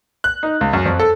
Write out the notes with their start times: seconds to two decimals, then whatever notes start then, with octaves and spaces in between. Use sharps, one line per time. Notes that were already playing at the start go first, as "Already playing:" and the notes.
0.24 F#6
0.43 D#4
0.61 C#2
0.73 F#2
0.86 F2
1.00 A4